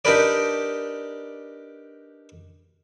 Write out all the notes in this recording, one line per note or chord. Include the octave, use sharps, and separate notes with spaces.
D4 D#4 G4 A#4 B4 D5